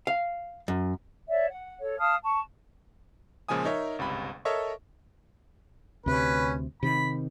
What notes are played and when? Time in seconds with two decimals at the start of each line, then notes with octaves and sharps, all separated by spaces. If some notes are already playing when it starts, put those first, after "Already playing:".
0.07 F5
0.68 F#2
1.29 C#5 D5 E5
1.49 F#5
1.80 A4 C#5
1.99 F5 A5 D#6 F6
2.23 A5 C#6
3.48 A#2 C#3 F3 G#3 G#5 D#6
3.65 D#4 A#4 C#5 E5
3.99 G1 C#2 C3 B5
4.45 A4 A#4 C#5 D#5 E5 C#6
6.06 D2 C3 C#4 B4
6.83 C3 D#3 B5